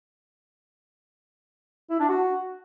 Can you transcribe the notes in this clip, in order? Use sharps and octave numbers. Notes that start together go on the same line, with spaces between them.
E4
D4
F#4